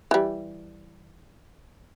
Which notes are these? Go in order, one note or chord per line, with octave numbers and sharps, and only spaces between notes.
E3 G3